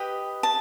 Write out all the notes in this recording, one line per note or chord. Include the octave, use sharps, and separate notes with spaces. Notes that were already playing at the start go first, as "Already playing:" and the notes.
Already playing: G4 B4 D#5
A5